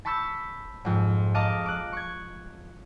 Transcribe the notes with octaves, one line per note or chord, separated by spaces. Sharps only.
A5 B5 C#6 E6 G6 A6
F2 G#2
D#5 F5 A5 A#5 D6
D6 F#6
C#6 G#6